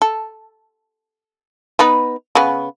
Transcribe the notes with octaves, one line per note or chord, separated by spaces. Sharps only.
A4
B3 D#4 B4
C#3 B3